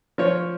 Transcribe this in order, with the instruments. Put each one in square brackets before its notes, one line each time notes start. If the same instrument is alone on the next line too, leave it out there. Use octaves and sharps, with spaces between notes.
[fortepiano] F3 C#5